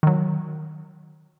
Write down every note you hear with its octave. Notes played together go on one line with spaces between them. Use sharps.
D#3 F#3